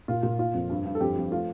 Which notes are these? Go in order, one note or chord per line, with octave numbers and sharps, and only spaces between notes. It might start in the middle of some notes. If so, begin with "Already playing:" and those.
A#2 F4
A#2
A#3 F4
F2
G2
G2
A4
F2 G4
F2
A3 F4